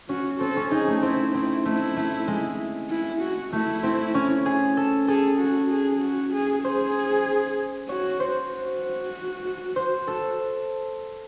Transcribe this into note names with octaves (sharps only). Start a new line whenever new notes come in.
C#4 F#4
C4 A4
C#4
D#4 G#4
A3
C4 E4
C4 E4
A3 E4
A3
G#3
E4
F#4
A3 E4
C4
C#4
G#4
A4
G#4 A4
F#4
G#4
F#4
G#4
G#4 C5
F#4 C#5
C5
F#4
C5
A4